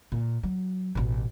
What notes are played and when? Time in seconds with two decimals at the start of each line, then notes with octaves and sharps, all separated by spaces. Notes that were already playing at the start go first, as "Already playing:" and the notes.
0.12 A#2
0.43 F#3
0.95 A1 B2